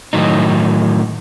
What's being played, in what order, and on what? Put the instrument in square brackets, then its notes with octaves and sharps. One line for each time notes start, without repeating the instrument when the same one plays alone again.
[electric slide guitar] A2 D#3 F#3 D#4